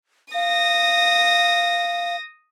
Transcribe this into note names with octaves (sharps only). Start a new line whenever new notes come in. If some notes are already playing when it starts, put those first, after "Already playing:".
F5 D#6 A#6